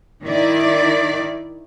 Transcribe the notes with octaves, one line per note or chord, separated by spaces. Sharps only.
D#3 E4 D5